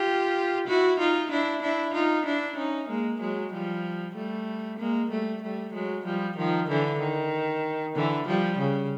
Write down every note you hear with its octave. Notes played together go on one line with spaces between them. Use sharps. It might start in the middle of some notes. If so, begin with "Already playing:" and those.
Already playing: F4 G4
E4 F#4
D#4 F4
D4 E4
D4 E4
D#4 F4
D4 E4
C#4 D#4
G#3 A#3
F#3 G#3
F3 G3
G3 A3
G#3 A#3
G3 A3
G3 A3
F#3 G#3
F3 G3
D#3 F3
D3 E3
D#3
D3 E3
F3 G3
C#3